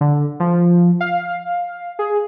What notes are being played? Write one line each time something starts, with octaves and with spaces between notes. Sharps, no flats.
D3
F3
F5
G#4